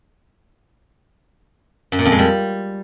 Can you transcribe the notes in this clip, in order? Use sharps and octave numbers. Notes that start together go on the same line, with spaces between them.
F#2
A#2
F2
G#3
G3